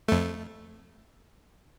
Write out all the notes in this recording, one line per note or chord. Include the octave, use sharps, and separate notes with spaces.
F2 A3